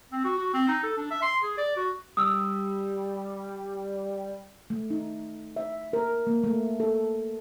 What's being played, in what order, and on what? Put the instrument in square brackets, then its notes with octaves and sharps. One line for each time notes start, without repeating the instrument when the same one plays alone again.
[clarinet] C4
F#4
F#4
C4
D#4
A4
D4
E5
C6
G#4
D5
F#4
[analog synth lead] G3 [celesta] D#6 E6
[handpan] A3
D#4
E5
A#4
A#3
A3
A4